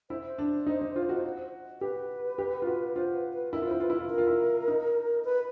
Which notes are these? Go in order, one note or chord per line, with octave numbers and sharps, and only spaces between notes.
E4 C5
C5
D4
D#4
D#4
F4
F#4
G4 B4
G4
F4
F#4
F4 C5
B4
B4
E4 A#4
F4
E4 C5
F4 B4
E4
F4
E4 A#4
F4
E4
D#4
B4